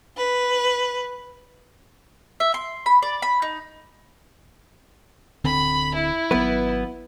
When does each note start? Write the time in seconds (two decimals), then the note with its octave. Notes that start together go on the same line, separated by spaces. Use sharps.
0.17 B4
2.40 E5
2.54 C6
2.86 B5
3.02 D5
3.22 B5
3.42 D#4
5.44 D1 D3 C4 B5
5.94 E4
6.31 G#1 F#3 B3 B4